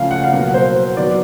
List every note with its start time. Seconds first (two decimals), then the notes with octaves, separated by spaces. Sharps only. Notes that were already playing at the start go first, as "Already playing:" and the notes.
Already playing: C#3 F3 A3 F5
0.11 F#5
0.24 F5
0.32 B2 F#3 A#3 F#5
0.54 C5
0.97 D#3 F#3 B3 D5